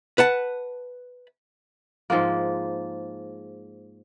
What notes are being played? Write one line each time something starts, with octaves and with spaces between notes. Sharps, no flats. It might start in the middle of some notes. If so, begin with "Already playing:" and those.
B4 F#5 A5
G#2 F3 G#3 A#3